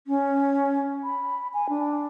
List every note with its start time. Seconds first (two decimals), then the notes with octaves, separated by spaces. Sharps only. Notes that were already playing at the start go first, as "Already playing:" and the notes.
0.07 C#4
1.03 B5
1.53 G#5
1.69 D4